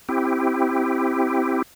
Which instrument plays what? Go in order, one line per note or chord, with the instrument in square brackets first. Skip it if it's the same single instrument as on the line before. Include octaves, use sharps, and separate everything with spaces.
[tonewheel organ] C4 E4 G4